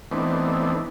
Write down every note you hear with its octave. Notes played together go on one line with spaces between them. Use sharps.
E3 A3 B3 C4 D4 D#4